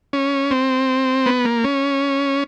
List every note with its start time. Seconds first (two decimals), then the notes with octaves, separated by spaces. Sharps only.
0.13 C#4
0.51 C4
1.26 B3
1.45 A#3
1.64 C#4